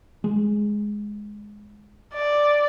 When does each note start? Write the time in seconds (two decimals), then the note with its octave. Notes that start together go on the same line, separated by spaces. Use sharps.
0.24 G#3
2.14 D5